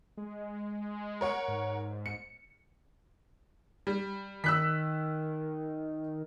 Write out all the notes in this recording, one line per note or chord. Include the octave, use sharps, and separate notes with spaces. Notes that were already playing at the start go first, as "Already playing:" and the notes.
G#3
A#4 C#5 F#5
G#2
C#7
G3
D#3 E6 F#6 B6